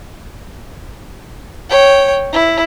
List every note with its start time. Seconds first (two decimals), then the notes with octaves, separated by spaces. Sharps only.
1.70 C#5 G5
2.32 E4